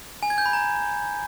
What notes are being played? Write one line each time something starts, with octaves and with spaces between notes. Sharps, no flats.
G#5
G#6
G6
B5
A#5